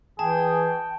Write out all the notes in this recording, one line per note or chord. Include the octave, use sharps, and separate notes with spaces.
E3 G#4 G5 A5